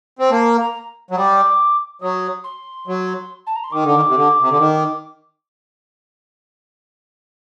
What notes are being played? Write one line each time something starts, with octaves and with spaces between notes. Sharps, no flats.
C4
A#3 A5
A#5
F#3
G3 D6 D#6
F#3 D#6
C6
F#3
A5
A#5
C6
D#3 D6
D3
D#3
C3
D3
C3
D3
D#3